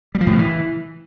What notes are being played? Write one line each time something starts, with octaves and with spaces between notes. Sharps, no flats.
G3
F3
A2
C#3
E3